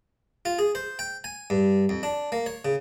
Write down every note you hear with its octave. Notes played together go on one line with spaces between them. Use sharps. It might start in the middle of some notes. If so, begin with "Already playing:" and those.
F4
G#4
C5
G5
G#5
G2
F2
D4
A#3
C#5
C#3